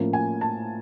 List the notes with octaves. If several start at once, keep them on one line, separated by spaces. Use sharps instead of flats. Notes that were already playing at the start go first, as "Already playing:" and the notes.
Already playing: A2 F3 A#3 C#4
G#5
A5